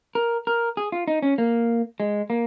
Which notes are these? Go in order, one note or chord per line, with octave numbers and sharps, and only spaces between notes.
A#4
A#4
G#4
F4
D#4
C#4
A#3
G#3
A#3